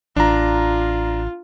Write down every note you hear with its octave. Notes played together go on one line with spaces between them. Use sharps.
A1 D4 F4 A#5